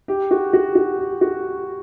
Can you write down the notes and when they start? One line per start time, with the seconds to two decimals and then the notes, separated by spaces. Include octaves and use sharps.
0.08 G4
0.31 F#4
0.53 F#4
0.75 F#4
0.98 G4
1.21 F#4